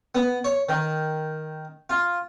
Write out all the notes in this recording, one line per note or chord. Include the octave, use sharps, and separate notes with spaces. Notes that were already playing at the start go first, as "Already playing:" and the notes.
B3
C#5
D#3
F4